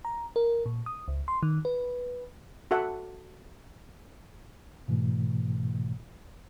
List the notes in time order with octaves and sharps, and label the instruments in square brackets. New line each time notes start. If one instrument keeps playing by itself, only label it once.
[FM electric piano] A#5
A#4
A#2
D#6
C#2
C6
D#3
B4
[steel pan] F#4 A4 E5 F#5
[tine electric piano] G#2 B2 E3 A3